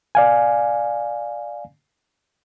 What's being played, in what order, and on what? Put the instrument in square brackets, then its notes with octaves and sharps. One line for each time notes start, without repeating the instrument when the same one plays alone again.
[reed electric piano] D5 F5 G#5